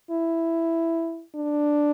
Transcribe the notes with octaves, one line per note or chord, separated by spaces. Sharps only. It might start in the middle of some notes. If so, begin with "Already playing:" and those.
E4
D4